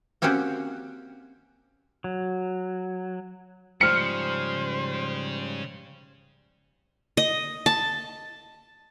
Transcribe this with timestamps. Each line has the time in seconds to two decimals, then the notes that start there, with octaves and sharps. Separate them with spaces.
0.22 A#3 C4 C#4 F#4 G4
2.04 F#3
3.81 G#2 C#3 F3 G3 C5 F6 C#7
7.17 D#5
7.66 A5